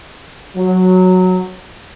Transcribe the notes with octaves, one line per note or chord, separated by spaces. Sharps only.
F#3